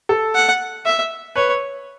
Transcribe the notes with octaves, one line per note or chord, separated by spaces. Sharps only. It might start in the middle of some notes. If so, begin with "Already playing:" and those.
A4
F#5
E5
B4 C#5